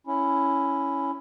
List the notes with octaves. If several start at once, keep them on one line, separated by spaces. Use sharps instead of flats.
C#4 E4